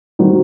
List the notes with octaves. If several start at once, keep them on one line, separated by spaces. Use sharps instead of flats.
D#3 G3 C4 D#4 F#4